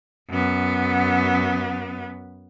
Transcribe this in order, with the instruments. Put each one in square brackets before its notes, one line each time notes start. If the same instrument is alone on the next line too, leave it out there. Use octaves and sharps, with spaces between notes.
[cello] F#2 B3